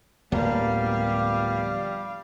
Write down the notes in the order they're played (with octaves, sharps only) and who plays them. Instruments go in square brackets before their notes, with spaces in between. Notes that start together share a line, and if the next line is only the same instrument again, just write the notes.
[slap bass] D1 [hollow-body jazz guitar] F3 A#3 B3 [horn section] G3 [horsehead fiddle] F5